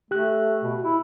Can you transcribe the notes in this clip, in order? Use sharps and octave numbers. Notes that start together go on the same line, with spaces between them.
A3 G4 F#6
B2
E4